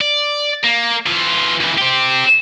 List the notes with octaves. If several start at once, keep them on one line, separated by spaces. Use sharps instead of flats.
D5
A#3
E3 F4
C#2 E3
C4 G4